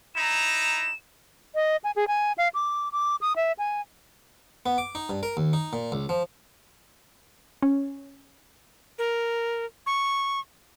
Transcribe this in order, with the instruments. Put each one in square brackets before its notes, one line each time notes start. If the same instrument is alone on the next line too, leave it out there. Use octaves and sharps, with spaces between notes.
[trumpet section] D#4 E4 A#5 [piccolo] E7
[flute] D#5
G#5
G#4
G#5
F5
D6
D6
D#6
E5
G#5
[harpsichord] B3
D6
D#4
G2
A#4
D#2
D#4
A#2
C#2
F3
[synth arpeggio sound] C#4
[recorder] A#4
C#6